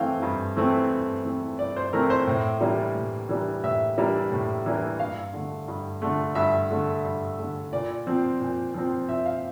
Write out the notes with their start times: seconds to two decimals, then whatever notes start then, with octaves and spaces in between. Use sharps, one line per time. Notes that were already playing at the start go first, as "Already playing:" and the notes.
Already playing: G2 E3 A3 C4 F5 G5
0.23 G2
0.57 E3 A3 C4
0.91 G2
1.25 E3 A3 C4
1.59 G2 D5
1.77 C5
1.93 E3 A3 C4 A#4
2.10 C5
2.27 A2
2.61 E3 G3 A#3 D4
2.95 A2
3.29 E3 G3 A#3 D4
3.64 A2 E5
3.97 E3 G3 A#3 D4
4.32 A2
4.66 E3 G3 A#3 D4
4.99 G2 F5
5.33 D3 A3
5.68 G2
6.02 D3 A3
6.35 G2 E5
6.71 D3 A3
7.04 G2
7.38 D3 A3
7.72 A#2 D5
8.07 F3 C4
8.41 A#2
8.74 F3 C4
9.08 A#2 E5
9.26 F5